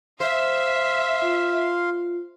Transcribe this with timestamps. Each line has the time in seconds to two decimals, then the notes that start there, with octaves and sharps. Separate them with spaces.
0.20 C5 E5 F5 C6
1.22 F4